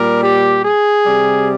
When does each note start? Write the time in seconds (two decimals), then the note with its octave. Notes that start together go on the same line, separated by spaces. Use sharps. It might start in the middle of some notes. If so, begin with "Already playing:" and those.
Already playing: A#2 G3 A#4
0.23 G4
0.65 G#4
1.06 C3 G3